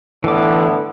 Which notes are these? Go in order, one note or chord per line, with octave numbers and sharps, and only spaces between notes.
A2 D3 E3 B3 D6